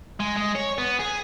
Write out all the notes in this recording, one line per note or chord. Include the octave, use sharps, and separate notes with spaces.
G#3
G#3
C#5
B3
G#4